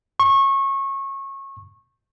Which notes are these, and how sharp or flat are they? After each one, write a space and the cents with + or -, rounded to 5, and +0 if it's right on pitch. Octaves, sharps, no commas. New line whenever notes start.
C#6 -25